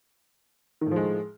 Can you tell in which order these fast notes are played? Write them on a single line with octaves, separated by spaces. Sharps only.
D#3 A2 F3 G#3